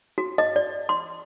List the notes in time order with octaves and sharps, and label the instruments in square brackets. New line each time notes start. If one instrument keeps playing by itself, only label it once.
[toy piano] F#4
D#5
D5
C6